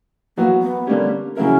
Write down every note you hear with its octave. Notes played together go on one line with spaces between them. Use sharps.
F#3 A#3 B3 F#4
B3
D3 G3 A#3 C#4 G4
C#3 F#3 A#3 C#4 E4 A#4